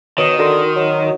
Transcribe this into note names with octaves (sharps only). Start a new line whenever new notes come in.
B2 D#3 C#5 D#6
D3 F#4 A#4 C6
F#3